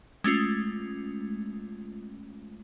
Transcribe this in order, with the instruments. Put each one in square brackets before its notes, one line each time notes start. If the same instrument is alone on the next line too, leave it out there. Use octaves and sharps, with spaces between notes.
[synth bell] G#3 A3 C#4 F4